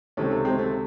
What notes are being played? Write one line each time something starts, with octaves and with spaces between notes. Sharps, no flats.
C#2 C3 D#3 A3 C#4
A3
G#3 C4
A3